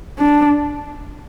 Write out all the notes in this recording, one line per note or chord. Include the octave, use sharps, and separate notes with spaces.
D4